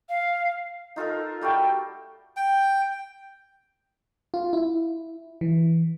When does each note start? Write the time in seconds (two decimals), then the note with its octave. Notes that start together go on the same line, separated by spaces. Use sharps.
0.09 F5
0.96 D#4 F4 A4 A#4
1.41 G3 A3 F#4 G5
2.37 G5
4.34 F4
4.53 E4
5.41 E3